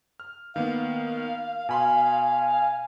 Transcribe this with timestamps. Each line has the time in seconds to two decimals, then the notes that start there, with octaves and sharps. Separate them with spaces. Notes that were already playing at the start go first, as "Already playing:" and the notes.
0.20 F6
0.56 D#3 A#3 B3 F5
1.69 B2 G#5 B5 C6